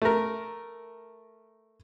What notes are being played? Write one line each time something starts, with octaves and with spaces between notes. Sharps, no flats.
A3 A#4